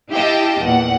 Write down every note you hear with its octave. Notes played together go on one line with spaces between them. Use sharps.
E4 G4 D#5 F5 G5 A5
E2 A#2 F#5